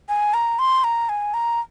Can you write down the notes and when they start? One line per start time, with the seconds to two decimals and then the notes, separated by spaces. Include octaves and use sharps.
0.09 G#5
0.34 A#5
0.59 C6
0.84 A#5
1.09 G#5
1.34 A#5